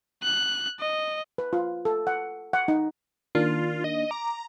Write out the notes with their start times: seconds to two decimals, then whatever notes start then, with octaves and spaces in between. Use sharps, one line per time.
0.23 F#6
0.80 D#5
1.38 B4
1.53 F4
1.85 A4
2.07 F#5
2.53 F#5
2.68 D#4
3.35 D#3 A#3 D4 F4
3.84 D#5
4.11 A#5 D6